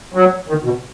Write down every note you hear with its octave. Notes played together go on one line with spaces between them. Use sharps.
F#3
D#3
B2